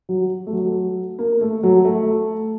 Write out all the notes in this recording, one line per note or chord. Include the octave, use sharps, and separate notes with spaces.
F#3
A3
F#3
A#3
A3
F#3
A3